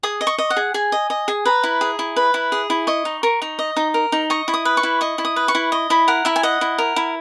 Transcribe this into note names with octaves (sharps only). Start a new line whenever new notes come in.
G#4 D#6
D#5
C#6
D#5
F#5
G#4
G#4 G#5
D#5
D#5
G#4
B4 A#5
E4
G#4
E4
B4
E4
G#4
E4
D#5 C#6
D#4
A#4 C#6
D#4
D#5
D#4
A#4
D#4
D#5 C#6
E4
D#6
B4
C#6
E4
D#5 C#6
E4
D#6
B4
C#6
E4
D#5
E4 B5
A#4 F#5
E4 E5
G#5
D#5 F#5
E4
A#4
E4